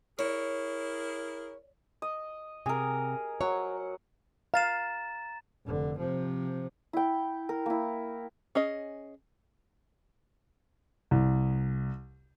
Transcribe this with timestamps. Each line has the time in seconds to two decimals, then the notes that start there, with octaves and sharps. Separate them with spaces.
0.19 E4 G#4 A#4 C#5
2.02 D#5
2.66 C3 G#4 A#4
3.41 F#3 C#5 F#5
4.54 F5 A#5 A6 E7
5.66 F1 D3
5.98 C3 F3
6.93 E4 G5
7.49 A#4
7.66 A#3 E4
8.55 C#4 G#4 D#5
11.11 C2